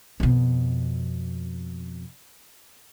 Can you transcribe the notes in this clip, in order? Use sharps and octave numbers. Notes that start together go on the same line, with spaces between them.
F2 B2